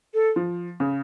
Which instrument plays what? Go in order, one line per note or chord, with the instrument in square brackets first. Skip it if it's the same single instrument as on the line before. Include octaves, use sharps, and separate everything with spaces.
[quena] A4
[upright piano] F3
C#3